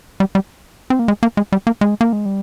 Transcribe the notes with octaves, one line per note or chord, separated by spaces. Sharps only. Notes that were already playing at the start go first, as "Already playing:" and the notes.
G3
G3
C4
A#3
G#3
A#3
G#3
G3
A#3
G#3
A#3
G#3
G3